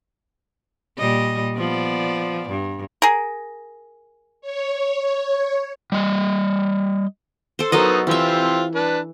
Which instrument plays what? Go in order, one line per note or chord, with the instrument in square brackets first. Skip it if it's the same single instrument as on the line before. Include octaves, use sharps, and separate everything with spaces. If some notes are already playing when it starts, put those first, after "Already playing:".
[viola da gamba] A#2 G3 D#5
F3 B3 D5
G2
[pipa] G#4 A#4
[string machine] C#5
[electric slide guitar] G3 D#5
[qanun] A4 C5
[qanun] F#3 A4 D#5 [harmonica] B3 D#4 A#4
[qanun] E3 E5 [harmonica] C4 F4 G4
[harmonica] D4 B4